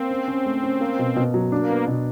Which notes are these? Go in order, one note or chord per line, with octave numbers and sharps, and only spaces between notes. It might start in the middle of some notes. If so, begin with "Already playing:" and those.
Already playing: A#3 C4
C#4
C#4
A3
C#4
A#3
B2
B2
F#3
A#3 D4
B3
B2